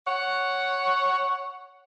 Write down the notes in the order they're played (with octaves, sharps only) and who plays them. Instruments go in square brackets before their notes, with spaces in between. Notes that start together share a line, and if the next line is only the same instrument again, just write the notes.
[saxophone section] C#5 F#5